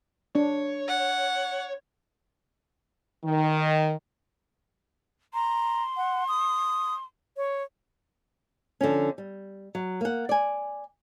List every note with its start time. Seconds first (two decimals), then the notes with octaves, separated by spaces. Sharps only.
0.35 D4 C#5
0.88 F#5
3.23 D#3
5.34 A#5 C6
5.97 F#5
6.28 D#6
7.37 C#5
8.81 D3 F3 C#4
9.18 G3
9.75 F#3
10.01 A#3 F#5
10.29 D5 G#5